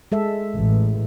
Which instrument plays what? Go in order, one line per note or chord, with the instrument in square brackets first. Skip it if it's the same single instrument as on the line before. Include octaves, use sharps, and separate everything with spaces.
[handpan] G#3 A4 E5
[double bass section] A1